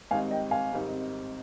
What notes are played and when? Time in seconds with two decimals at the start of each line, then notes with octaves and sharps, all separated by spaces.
0.11 G#1 G#2 G3 C4 D#4 F5 G#5
0.31 D#5 G5
0.51 F5 G#5
0.72 G#1 G#2 G3 C4 D#4